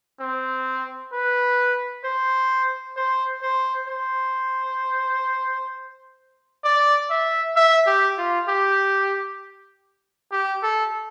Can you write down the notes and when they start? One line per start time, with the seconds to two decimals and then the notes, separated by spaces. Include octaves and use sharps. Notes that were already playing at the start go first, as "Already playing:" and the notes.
0.20 C4
1.12 B4
2.04 C5
2.96 C5
3.42 C5
3.87 C5
6.64 D5
7.10 E5
7.56 E5
7.86 G4
8.17 F4
8.48 G4
10.32 G4
10.63 A4